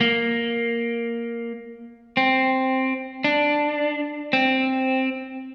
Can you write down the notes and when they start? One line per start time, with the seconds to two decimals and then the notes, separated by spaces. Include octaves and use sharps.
0.01 A#3
2.17 C4
3.24 D4
4.33 C4